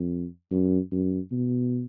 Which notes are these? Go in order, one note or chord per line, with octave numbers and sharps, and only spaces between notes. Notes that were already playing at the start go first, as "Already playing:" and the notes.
Already playing: F2
F#2
F#2
B2